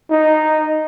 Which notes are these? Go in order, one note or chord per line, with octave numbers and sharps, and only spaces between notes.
D#4